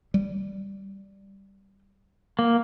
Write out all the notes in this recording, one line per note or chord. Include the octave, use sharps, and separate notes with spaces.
G3
A#3